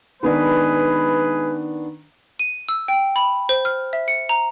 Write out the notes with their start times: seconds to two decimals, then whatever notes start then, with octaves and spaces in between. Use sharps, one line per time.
0.23 D#3 G#3 B3 D4 G#4 B4
2.39 D#7
2.69 E6
2.88 G5
3.16 B5
3.49 C5
3.65 F6
3.93 E5
4.08 C#7
4.29 A#5